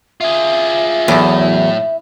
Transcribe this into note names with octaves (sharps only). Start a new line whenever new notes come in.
F4 G#4 E5
E2 A2 F#3